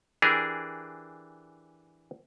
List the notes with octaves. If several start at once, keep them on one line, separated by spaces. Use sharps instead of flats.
E3 D4 G4 G#4 A#4